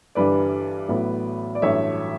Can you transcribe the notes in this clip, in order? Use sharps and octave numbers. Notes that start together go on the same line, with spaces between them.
G1 G2 E3 G3 B4 D5
A1 A2 F#3 B3
D5
A1 G2 F#3 A3 C#5 E5